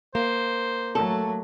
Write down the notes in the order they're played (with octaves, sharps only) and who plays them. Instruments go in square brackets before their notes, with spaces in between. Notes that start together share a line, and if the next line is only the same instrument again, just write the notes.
[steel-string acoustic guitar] A#3 [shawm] C5
[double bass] F#3 A3 [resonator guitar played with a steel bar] A4